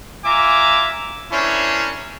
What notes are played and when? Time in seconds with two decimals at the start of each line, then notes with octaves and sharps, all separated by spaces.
0.25 F4 E5 G#5 A#5 D6
1.32 C#4 D4 E4 A#4 C5 C#5